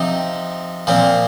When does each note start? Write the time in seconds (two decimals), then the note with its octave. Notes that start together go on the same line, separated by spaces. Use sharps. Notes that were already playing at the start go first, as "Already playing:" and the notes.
Already playing: C3 F3 C4 D#4
0.87 A#2 F3 C4